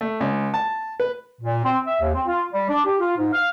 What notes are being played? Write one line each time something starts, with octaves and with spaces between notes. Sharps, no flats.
A3
C#2
A5
B4
A#2
C4
E5
D#2
C4
F4
G3
D4
G4
F4
G#2
F5